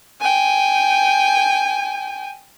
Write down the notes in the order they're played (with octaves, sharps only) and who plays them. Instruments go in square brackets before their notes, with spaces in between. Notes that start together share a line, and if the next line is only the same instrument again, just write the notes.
[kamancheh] G5 G#5